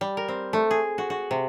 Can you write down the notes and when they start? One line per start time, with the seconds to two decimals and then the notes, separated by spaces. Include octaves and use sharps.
0.01 G3
0.17 A#4
0.28 C4
0.53 A3
0.71 G#4
0.98 F#4
1.10 F#4
1.31 C3